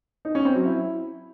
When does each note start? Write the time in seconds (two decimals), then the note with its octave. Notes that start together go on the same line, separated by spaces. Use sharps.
0.25 D#4
0.35 C#4
0.45 C4
0.55 F#3
0.65 E4